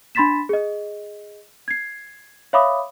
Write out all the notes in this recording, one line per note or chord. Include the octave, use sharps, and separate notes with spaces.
D4 B5 C6 A6 B6 E7
G#4 D#5
G#6 C7
C#5 E5 F5 B5 D6 D#6